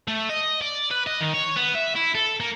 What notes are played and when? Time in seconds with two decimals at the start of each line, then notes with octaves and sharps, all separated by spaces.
0.08 A3
0.29 D#5
0.62 D5
0.91 B4
1.07 D#5
1.21 D#3
1.34 C#5
1.57 B3
1.75 E5
1.96 E4
2.15 A4
2.40 A#3